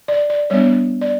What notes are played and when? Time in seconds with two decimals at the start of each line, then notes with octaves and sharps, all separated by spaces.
0.08 D5
0.30 D5
0.50 G3 B3 D4 C#5
1.01 D5